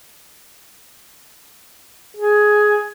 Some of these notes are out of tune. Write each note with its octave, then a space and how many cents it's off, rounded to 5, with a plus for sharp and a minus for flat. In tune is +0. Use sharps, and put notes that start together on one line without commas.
G#4 +10